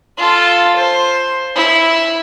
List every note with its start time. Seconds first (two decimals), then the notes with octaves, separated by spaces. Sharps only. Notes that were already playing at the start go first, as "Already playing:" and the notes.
0.18 F4 A4
0.76 C5
1.56 E4